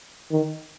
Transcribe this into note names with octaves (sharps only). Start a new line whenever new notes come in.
D#3